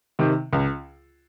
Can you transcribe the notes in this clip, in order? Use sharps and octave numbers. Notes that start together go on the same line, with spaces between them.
C3 D#3
C#2